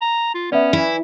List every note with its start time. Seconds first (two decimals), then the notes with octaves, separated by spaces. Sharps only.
0.01 A#5
0.34 F4
0.52 B3 C#4 D5 E5
0.73 E3 E4